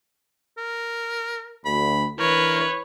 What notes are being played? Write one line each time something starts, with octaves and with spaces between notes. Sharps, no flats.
A#4
D2 B5
E3 D4 E4 A#4 B4 C#5